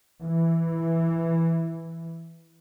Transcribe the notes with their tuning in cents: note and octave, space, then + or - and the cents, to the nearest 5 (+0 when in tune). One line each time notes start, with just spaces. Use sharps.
E3 +0